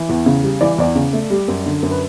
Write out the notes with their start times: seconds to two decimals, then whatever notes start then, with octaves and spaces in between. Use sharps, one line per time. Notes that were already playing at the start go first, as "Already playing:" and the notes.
Already playing: E3
0.09 E2
0.26 C#3
0.44 G3
0.61 E3 D5
0.78 E2 D5
0.96 C#3
1.13 A3
1.30 G3
1.48 F#2
1.66 D3
1.83 F#2
1.91 B4